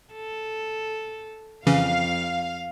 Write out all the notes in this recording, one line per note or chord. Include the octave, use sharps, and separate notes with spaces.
A4
F2 C#3 E3 C#4 F5